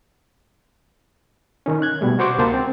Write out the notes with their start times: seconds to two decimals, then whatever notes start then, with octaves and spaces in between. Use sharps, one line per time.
1.66 D#3 C#4
1.82 F#6 G#6
2.01 B2 G3 A3
2.19 F#4 C5 C#6 D6
2.38 C#2 A#3 C5 A5 A6
2.54 C4